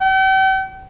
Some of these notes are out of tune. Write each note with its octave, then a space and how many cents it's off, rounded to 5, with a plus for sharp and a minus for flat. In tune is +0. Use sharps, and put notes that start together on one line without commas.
G5 -45